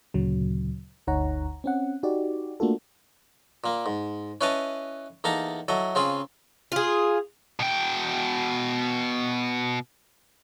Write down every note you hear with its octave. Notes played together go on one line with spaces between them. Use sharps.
D2 A#2 C#3 F#3
G1 D2 D#4 C#5 F#5 A#5
C4 C#4 F#5
D#4 F#4 G4 D5
A3 A#3 D4 F4 F#4 A4
A#2 A#3
G#2
C#4 E4 B4 C#5 D#5 A5
E2 A#3 D#4 A4 A5 A#5
F#3 E4 A4 D#5
C#3 C4 F4 G#4 B5
F4 G#4
B2 G5